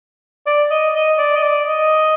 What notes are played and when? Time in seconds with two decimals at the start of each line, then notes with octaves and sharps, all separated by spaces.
0.46 D5
0.70 D#5
0.94 D#5
1.18 D5
1.35 D#5
1.42 D5
1.67 D#5